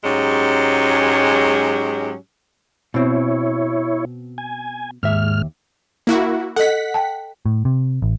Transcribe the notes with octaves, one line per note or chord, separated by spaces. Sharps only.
G#2 F#3 G#3 C#4 G4
B2 C4 E4 C#5
G#5
D#2 G#2 E5 F6
A#3 E4 F#4
A4 D#5 F#5 B6
G5 A5
A2
C3
A1